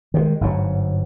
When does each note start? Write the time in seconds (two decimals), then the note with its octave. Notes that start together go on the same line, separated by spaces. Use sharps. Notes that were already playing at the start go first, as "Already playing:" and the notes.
0.14 D#3 F3 G#3
0.41 G1 G#2 B2 F#3